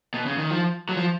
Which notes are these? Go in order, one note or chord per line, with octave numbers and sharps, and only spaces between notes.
B2
C#3
D#3
F3
F#3
F3